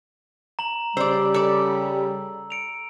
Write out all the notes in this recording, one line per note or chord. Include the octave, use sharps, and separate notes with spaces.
A#5 F#7
C#3 G3 C5 D5 E6
A4 D5
C#7 D7 F7